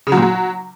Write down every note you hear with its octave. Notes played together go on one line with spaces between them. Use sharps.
C#3
F#3
A#2
F#3